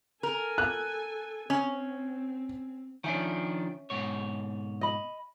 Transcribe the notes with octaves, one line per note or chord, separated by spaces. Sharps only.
A4 A#4 G#5
F#6
C4 C#4
D#3 F3 C#4 D4 E5 G#5
G#2 B2 C#5
D#5 B5